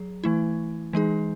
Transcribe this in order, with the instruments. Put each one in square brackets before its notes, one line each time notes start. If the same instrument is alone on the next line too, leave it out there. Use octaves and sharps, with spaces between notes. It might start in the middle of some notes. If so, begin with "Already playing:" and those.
Already playing: [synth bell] F#3 G#4
E3 A3 E4
E3 G#3 D#4 G#4